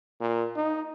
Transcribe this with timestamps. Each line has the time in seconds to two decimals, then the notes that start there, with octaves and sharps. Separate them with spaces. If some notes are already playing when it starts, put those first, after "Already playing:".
0.20 A#2
0.56 D#4